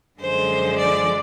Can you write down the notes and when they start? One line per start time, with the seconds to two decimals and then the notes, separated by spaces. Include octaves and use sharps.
0.19 F#2 D3 F3 G#3 C5
0.77 D5